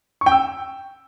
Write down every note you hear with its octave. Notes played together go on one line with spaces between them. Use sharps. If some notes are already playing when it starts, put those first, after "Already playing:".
C#6
G5
E6